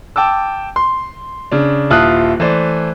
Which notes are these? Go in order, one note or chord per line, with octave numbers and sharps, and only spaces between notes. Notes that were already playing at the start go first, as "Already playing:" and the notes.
G5 A5 D6 E6
C6
C#3 D4
D#1 E4 F4 A5 D#6 F#6
E3 A3 C5 D5